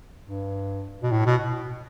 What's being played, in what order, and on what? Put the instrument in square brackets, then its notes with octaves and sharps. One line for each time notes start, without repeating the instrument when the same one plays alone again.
[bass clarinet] G2
B2
A2
B2